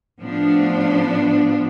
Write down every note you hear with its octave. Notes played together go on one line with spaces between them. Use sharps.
A2 F3 B3 D4